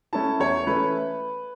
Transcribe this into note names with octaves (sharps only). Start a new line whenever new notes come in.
A3 C#4 E4 A5
E2 C#5
E3 A3 C#4 E4 B4